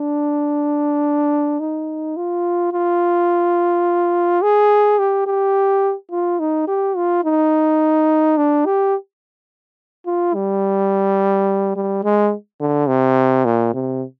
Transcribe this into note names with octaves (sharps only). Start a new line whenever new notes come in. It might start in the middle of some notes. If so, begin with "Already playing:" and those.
Already playing: D4
D#4
F4
F4
G#4
G4
G4
F4
D#4
G4
F4
D#4
D4
G4
F4
G3
G3
G#3
D3
C3
A#2
C3